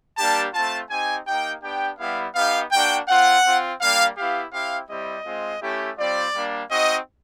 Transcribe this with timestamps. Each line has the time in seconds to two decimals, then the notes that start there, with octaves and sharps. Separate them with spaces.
0.18 G3 A#3 D4 G4 A5
0.54 A3 C4 F4 A5
0.90 C4 D#4 G4 G#5
1.27 A#3 D#4 G4 G5
1.63 B3 D4 G4 G5
1.99 G3 B3 E4 G4 F5
2.35 B3 D#4 G4 F5
2.72 A#3 D4 F#4 G5
3.08 C4 F4 F#5
3.44 C4 F4
3.80 G3 A#3 D4 G4 F5
4.17 B3 E4 G4 F5
4.53 C4 E4 G4 F5
4.89 G3 C4 E4 G4 D#5
5.26 G#3 C4 F4
5.62 A3 C#4 E4 G4
5.98 G3 C4 F4 D5
6.34 G3 A#3 D4
6.70 C4 D#4 F#4 D#5